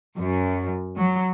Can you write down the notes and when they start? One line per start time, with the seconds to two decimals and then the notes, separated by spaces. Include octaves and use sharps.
0.18 F#2
0.97 F#3